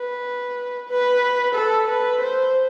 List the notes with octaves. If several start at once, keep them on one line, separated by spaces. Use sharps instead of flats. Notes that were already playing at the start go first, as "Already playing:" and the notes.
Already playing: B4
B4
A4
B4
C5